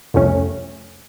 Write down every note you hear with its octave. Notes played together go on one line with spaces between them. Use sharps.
C2 F2 A3 C#4